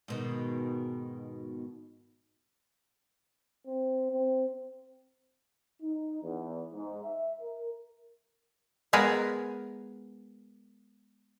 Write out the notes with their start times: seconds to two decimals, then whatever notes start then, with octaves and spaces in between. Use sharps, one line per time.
0.08 G#2 B2 D#3
3.66 C4
4.12 C4
5.81 D#4
6.22 E2
6.73 G#2
7.04 E5
7.41 A#4
8.93 G#3 B3 G#4 A#4